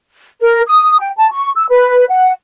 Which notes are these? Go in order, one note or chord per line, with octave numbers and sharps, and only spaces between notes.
A#4
D#6
G5
A5
C#6
E6
B4
F#5